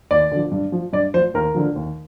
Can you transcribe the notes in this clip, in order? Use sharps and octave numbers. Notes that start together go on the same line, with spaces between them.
D#2 D5
D3 F3
G2
F3
G2 D5
F3 C5
D#2 A#4
D3 F3
D#2